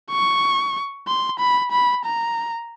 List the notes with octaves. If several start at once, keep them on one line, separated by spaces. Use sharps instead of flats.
C#6
C6
B5
B5
A#5